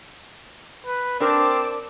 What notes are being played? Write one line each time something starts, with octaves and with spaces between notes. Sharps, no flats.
B4
C4 D4 A#4 C5 A5 D6